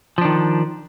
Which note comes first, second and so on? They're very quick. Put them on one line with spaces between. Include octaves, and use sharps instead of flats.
F3 D4 D#3